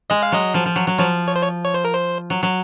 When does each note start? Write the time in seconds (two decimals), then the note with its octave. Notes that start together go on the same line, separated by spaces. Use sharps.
0.10 G#3 D#5
0.23 F5
0.32 F#3 D#5
0.54 F3
0.66 F3
0.76 F#3
0.87 F#3
0.98 F3 C#5
1.28 C#5
1.36 C5
1.42 C#5
1.65 C#5
1.74 C5
1.85 A#4
1.94 C5
2.30 F#3
2.43 F#3